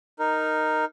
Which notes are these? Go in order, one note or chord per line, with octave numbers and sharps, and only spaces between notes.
D#4 A#4